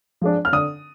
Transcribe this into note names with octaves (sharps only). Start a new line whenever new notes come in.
F3 G#3 D4
F6
D3 D#6